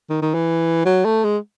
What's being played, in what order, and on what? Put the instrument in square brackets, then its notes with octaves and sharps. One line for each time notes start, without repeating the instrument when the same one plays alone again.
[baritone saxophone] D#3
D#3
E3
F#3
A3
G#3